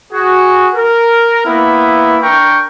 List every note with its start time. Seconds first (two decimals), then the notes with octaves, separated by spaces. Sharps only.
0.13 F#4 G#4
0.75 A#4
1.46 A#3 B3 E4
2.22 D4 A#4 G5 C#6